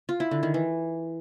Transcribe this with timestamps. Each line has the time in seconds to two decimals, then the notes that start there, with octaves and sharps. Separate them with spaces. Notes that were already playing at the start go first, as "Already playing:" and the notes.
0.09 F4
0.20 E4
0.31 D3
0.43 D#3
0.54 E3